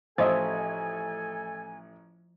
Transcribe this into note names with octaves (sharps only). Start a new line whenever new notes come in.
A1 F3 A4 C5 D#5 E5 G#5